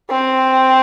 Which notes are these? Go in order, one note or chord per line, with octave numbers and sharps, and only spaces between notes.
C4